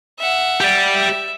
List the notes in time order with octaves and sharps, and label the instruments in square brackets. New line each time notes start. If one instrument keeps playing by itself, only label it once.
[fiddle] E5 F#5
[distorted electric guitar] G4 D5
[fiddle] E5